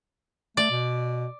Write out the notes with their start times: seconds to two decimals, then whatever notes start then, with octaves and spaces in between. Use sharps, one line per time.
0.57 A3 D5
0.71 B2